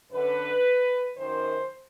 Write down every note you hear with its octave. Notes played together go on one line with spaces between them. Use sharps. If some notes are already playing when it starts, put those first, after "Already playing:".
F#2 D3 B4
F#2 D#3 C5